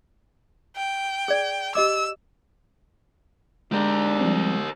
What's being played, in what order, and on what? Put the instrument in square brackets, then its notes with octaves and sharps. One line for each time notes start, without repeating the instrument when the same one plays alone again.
[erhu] G5
[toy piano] G#4 D5
[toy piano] G4 D#5 D6 [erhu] E6
[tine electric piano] G#3 [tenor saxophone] D4 [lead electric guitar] G4 A#4
[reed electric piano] F3 G3 C4